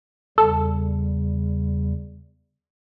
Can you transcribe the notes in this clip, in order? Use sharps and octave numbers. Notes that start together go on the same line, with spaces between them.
E2 C#3 G3 A4